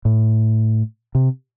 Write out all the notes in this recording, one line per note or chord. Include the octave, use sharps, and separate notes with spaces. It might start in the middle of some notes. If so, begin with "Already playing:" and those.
A2
C3